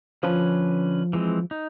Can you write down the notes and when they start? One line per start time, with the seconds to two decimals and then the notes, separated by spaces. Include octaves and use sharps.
0.23 D3 F3 C#4 B4
1.13 E3 G#3 C4
1.51 D#4